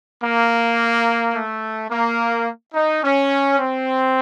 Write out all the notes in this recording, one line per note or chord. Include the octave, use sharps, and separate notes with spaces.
A#3
A3
A#3
D#4
C#4
C4